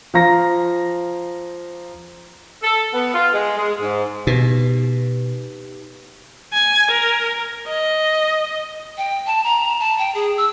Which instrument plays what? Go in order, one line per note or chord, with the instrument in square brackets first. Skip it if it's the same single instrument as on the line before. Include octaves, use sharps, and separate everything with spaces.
[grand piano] F3 F5 A#5 A#6
[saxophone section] A4
B3
F4
G#3
G#3
G#2
[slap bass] B2 [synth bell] D#4 G4 B4
[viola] G#5
A#4
D#5
[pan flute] G5
A5
A#5
A5
G5
G#4
E6